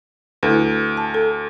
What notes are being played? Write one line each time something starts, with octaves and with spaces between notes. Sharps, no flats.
D2 E4 A4 B4
A5
A4